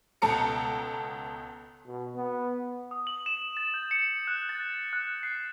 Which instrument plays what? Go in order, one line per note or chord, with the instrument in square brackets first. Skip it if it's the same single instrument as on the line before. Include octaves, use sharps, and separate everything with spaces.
[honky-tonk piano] C#2 B2 A4 A#5 C#7 D7
[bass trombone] B2
B3
[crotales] D#6
F#7
E7
A6
G6
C#7
F#6
A6
F#6
C7